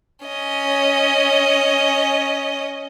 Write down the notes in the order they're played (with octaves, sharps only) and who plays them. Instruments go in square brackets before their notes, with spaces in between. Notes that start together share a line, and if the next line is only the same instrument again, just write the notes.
[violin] C#4 D#5